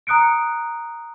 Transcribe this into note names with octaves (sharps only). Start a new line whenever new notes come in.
A#5 D#6 F#6 C#7 D7